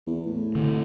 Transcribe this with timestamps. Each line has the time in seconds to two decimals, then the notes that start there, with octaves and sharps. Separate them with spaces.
0.07 E2
0.26 A2
0.55 D3 C4